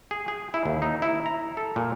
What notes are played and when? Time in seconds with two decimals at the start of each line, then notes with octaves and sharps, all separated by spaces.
0.11 G#4
0.28 G#4
0.54 E4
0.65 D#2
0.82 D#4
1.02 E4
1.26 A#5
1.57 A4
1.76 A#2